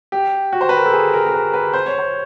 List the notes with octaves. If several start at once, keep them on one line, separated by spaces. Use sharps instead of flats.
G4
F#4
C5
B4
A#4
A4
G#4
A#4
A#4
B4
B4
C5
C#5
C5